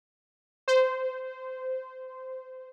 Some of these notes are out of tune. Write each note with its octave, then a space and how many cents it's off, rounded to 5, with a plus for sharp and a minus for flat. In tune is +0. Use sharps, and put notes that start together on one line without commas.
C5 -20